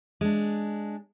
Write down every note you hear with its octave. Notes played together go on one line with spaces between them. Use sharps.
G#3 D4